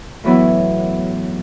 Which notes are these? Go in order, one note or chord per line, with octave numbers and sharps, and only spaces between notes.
A2 E3 F#3 B3 E4